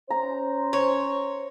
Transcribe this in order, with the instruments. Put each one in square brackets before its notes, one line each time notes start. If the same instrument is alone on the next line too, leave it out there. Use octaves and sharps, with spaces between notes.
[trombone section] C#4 C5 [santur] A#5
[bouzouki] C#5